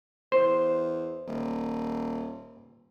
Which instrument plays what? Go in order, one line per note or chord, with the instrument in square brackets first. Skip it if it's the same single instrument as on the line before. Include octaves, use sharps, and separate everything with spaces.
[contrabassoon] E2 [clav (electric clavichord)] C5
[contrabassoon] D#1